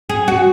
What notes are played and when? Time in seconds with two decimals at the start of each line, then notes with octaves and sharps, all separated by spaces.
0.09 G#4
0.28 F#4